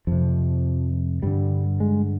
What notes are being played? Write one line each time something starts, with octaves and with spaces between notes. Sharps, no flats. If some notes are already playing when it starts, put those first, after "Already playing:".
F2 C3 F3
G2 D3 G3
G#3